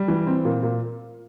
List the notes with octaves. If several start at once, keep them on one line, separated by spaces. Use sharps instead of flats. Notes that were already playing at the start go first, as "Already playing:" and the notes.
Already playing: G3
E3
C4
A#2
A#2